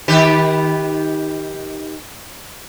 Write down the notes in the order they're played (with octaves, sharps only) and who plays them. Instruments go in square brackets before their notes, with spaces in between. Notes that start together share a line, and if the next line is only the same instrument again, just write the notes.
[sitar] D#3 G4 B4